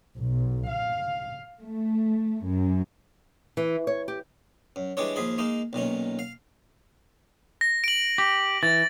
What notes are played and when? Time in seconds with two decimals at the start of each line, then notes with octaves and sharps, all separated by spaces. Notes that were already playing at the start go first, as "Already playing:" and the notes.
0.19 B1
0.72 F5
1.62 A3
2.45 F#2
3.57 E3
3.87 C#5
4.08 G4
4.76 F#2
4.97 E3 G3 G#3 D4 C#5
5.16 D#2 F3 G#4 B5
5.38 G#3 A#3 D#4
5.73 B1 A#2 D#3 C#4
6.19 F5
7.61 A#6
7.84 D7 F#7
8.18 G4
8.63 E3 A6